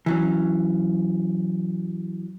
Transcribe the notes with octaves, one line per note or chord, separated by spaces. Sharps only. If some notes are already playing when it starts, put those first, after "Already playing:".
E3 F#3 C#4